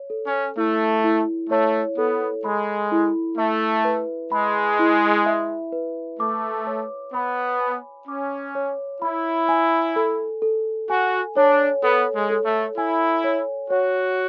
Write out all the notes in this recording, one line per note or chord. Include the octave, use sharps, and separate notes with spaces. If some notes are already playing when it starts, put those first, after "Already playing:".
Already playing: C#5
A4
C#4
A3 E4
E4
A3 C#5
B3 A4
G#3 B5
E4
A3 E5
B4
G#3 B5
E4
E5
B4
A3 D6
C#5
B3 B5
G#5
C#4 D6
C#5
E4 B5
G#5
A4
A4
F#4 G#5
D4 C#5
B3 A4
G#3
A4
A3
E4 G#5
C#5
F#4 C#5